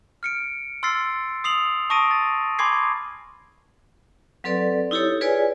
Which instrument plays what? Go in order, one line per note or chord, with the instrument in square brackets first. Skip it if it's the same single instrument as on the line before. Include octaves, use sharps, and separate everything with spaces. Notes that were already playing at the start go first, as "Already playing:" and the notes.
[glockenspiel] F6 C#7 D7
C6 E6 F6 A6 C7
D#6 C7 F7 F#7
A5 C#6 D#6 A#6 D7 D#7
A6
G#5 B5 C6 D6 G#6 C7
[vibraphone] F#3 C4 A4 B4 D5
D#4 E4 G4 A4 C#5
F4 G#4 B4 C#5 D5 G#5